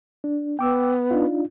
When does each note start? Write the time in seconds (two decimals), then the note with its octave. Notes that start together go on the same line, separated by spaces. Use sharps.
0.24 D4
0.59 B3 G5 D6 E6
1.11 D4 D#4 F4